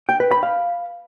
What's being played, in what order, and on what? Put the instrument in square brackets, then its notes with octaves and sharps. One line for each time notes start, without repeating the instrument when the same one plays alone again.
[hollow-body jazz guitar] G5
B4
B5
F5